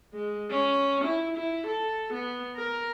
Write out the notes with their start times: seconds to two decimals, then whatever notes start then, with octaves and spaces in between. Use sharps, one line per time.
0.14 G#3
0.51 C#4
1.04 E4
1.37 E4
1.66 A4
2.13 B3
2.56 A#4